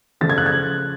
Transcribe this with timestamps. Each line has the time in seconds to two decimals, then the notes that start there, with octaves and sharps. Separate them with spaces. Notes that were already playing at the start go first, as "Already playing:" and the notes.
0.21 C#3 F3 A3 A6
0.30 G#6
0.38 F#6
0.46 G#6